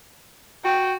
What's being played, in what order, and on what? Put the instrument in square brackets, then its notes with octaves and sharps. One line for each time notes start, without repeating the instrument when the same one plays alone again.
[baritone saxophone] F#4 [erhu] G5